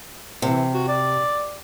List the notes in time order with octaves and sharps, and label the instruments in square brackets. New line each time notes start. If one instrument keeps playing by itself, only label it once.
[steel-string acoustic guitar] C3 [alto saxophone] E3
[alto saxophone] F#4
D5